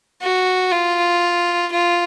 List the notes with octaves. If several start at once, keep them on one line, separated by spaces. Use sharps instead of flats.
F#4
F4
F4